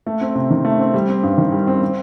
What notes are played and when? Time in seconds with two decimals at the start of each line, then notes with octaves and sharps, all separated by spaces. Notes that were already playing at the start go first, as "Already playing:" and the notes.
0.06 A3
0.21 C4
0.35 C3
0.50 D#3
0.65 A3
0.79 C4
0.94 G3
1.08 C4
1.23 G2
1.38 D#3
1.52 G3
1.67 C4
1.82 C4